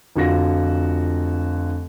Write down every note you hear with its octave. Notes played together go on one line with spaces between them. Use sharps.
F1 D3 F4 F#4 A#6